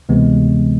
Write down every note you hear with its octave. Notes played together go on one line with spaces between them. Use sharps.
D2 C3 E3 G#3 B3